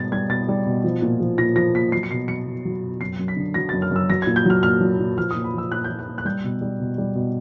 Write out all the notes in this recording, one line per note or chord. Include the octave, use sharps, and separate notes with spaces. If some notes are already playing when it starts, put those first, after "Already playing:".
Already playing: G#2 B2 G3 A6
G3 G#6
B2 A6
G3
B2
F3
A#2
F3
A#2 A#6
F3 A#6
A#2 B6
F#3 C7
C#7
B2 C7
F#3 C#7
B2
F#3
B2
F#2 C7
F#2
B6
D3
F#3 A#6
F#2 A6
F6
F#2 E6
F#3 A#6
A#2 G#6
G6
F#3 F6
A#2 F6
F#3
A#2
F3 F6
A#2 D#6
B5
F3 E6
A#2 F#6
F3 G6
F#6
A#2
F#6
G3 G6
B2
G3
B2
G3
B2